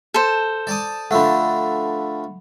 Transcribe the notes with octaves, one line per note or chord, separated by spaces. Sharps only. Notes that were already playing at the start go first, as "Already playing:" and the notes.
A4 C5
D5 A5 D#6
D3 F3 A3 F#5 B5